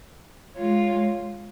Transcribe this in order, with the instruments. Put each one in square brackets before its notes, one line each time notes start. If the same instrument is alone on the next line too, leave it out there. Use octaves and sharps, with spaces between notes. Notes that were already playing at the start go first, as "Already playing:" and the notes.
[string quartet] G#3 F4 C#5